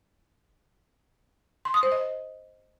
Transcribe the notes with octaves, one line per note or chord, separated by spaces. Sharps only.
C6
D#6
C5
D#5